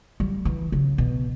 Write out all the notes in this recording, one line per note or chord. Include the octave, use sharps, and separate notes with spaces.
G3
E3
C#3
B2